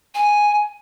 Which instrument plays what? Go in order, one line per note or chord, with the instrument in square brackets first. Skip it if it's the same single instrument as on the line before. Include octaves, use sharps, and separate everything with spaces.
[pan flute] G#5